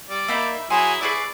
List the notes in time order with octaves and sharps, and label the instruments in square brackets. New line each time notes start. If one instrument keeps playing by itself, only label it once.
[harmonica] G3 [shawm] D5
[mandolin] A#3 D#4 B5 [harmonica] E5
[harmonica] F#3 G#4 [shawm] E4 [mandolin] G#5 C6
[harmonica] E4 [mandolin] G#4 B4 C#6 [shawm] D5